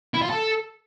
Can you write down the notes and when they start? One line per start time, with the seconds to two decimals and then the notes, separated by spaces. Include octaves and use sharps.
0.14 E4
0.22 F4
0.30 A4